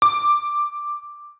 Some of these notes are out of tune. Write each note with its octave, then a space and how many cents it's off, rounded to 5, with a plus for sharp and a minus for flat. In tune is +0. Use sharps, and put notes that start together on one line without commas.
D6 +5